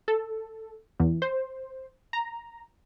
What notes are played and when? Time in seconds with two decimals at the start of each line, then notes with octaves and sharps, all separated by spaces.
0.08 A4
1.00 E2
1.22 C5
2.13 A#5